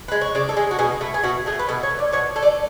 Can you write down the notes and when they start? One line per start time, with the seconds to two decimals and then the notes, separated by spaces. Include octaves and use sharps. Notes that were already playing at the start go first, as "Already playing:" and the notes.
0.08 G#3 B4
0.21 C#5
0.35 C#3 D5
0.49 A4
0.57 G#3 G#4
0.71 F#4
0.79 B2 G#4
1.01 A3 E4
1.14 G#4
1.23 B2 F#4
1.46 A3 G#4
1.59 B4
1.69 B2 A4
1.83 C#5
1.90 A3
1.99 D5
2.13 B2 C#5
2.36 A3
2.43 D5